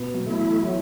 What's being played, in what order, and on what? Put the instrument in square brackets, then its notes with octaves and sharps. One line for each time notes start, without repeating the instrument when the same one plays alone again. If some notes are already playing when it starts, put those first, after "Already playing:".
Already playing: [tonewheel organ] B2 [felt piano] B3
[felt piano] F#3
[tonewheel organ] A3 E4
[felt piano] E3
[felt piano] E3 [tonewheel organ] F#3